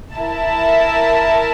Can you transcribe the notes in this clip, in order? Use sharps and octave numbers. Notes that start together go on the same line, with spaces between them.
E4 A#4 E5 A5